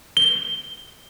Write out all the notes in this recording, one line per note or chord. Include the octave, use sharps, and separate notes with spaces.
G7